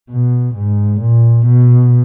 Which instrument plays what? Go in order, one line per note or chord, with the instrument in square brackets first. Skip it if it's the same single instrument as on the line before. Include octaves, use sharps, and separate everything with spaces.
[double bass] B2
G#2
A#2
B2